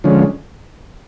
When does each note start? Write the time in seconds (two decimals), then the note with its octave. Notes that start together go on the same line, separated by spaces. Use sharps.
0.04 D3 F3 G#3 C#4